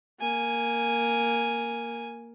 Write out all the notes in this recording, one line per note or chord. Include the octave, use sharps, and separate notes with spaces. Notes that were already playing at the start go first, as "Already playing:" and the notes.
A#3 G#5